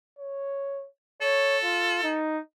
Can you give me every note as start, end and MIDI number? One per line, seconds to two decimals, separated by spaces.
0.18 0.86 73
1.21 2.17 69
1.21 1.57 73
1.64 1.99 65
2.03 2.39 63